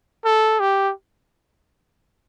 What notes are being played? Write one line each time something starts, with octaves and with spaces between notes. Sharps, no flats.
A4
G4